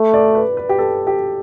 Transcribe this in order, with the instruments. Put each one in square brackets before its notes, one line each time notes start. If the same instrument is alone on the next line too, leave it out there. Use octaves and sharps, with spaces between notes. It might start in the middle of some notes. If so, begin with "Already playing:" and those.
Already playing: [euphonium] A3
[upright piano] D5
B4
B4
G4
A4
G4